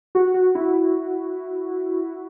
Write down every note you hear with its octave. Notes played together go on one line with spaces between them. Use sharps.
F#4
F#4
E4